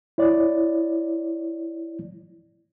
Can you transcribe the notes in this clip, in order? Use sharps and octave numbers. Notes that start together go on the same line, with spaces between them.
E4 C#5 D5